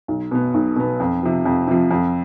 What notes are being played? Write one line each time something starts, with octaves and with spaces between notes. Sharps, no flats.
B1
B2 B3
B1
B2 B3
F2
C3 F3
F2
C3 F3
F2